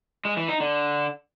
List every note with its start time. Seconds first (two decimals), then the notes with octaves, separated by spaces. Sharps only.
0.25 G#3
0.37 E3
0.49 D#4
0.60 D3